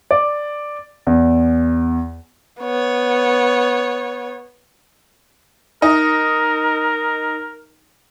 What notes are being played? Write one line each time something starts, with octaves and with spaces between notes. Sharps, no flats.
D5
E2
B3 C#5
D#4 A#4